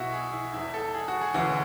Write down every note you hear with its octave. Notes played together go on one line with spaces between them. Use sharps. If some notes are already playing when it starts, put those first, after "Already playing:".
Already playing: B1 B2 E4 F#4
G#4
E4
E1 E2 B2 E4
A4
G#4
F#4
G#4
E1 D2 C#3 E3 F#4